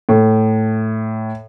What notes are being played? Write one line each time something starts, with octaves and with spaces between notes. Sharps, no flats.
A2